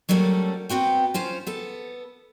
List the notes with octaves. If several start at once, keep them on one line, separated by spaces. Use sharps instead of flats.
F#3 G3 A3 A#3 C#4 A4
B3 C4 F#4 G5
C#4 F4 C5
B3 A4